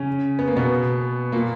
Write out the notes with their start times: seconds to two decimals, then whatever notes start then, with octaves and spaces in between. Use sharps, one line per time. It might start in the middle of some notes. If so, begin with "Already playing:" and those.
Already playing: C#3 C#4
0.39 B3
0.48 A#3
0.56 B2 B3
1.32 A#2 A#3